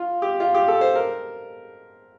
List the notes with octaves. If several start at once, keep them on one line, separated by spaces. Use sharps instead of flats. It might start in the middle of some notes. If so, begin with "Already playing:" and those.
Already playing: F4
G4
F4
G4
A4
C5
A#4